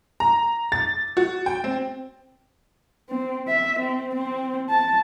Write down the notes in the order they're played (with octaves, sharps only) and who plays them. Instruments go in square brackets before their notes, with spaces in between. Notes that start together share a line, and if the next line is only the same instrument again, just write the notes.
[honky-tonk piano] A#5
A6
F#4
G5
C4
[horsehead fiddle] C4
E5
C4
C4
A5